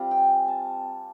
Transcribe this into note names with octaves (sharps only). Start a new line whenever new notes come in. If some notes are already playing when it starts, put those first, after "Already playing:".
Already playing: G3 C4 F4
G5
G#5
A5